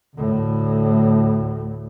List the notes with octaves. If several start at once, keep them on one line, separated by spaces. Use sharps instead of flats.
D2 A2